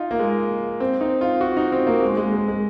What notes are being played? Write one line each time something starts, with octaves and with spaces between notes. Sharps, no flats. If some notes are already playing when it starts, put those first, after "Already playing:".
Already playing: D#4 F4
A#3
G#3
C4
D#4
F4
F#4
D#4
C4
A#3
G#3
G#3
G#3
G#3